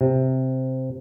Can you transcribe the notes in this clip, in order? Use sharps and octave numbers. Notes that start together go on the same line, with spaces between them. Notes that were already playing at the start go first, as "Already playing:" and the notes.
C3